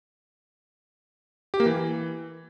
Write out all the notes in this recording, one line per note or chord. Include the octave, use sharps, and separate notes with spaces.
G4
A#3
E3